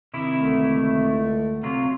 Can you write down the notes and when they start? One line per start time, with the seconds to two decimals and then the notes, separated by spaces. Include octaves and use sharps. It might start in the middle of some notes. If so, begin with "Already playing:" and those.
0.14 C3 D#3 E4
0.36 C#2 D3 A3
1.63 C3 F#3 F4